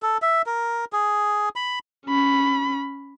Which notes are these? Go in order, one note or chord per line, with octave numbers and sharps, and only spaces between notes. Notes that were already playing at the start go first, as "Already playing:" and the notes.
A4
E5
A#4
G#4
B5
C#4 B5